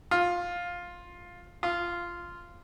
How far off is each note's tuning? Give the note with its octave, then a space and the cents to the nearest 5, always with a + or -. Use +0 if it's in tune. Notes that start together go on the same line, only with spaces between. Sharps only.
F4 +10
F4 -10